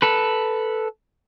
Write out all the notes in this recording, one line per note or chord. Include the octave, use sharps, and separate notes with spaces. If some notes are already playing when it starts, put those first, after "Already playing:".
A4 B4